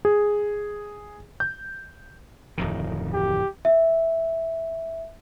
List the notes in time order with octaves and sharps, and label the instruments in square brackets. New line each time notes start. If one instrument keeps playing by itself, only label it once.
[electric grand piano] G#4
G6
[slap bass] D1 F2 D#3
[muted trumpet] G4
[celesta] E5